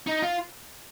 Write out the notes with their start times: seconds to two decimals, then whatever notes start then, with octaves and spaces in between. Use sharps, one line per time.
0.07 D#4
0.23 F4